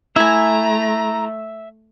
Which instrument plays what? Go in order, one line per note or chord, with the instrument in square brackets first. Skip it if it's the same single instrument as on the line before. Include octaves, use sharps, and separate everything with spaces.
[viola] A3 [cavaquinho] E4 G#5 [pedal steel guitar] E5 [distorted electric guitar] A#5